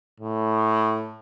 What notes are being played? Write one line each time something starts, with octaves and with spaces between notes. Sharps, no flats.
A2